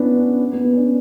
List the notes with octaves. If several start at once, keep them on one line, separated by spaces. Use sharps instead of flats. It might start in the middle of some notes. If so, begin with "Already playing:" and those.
Already playing: B3 C#4 D4 E4
C#4
B3
B3
C#4
D4